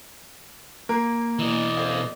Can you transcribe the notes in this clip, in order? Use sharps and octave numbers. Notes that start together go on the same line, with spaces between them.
A#3 A#4
B2 E3 D5 D#5
A4 C5 F5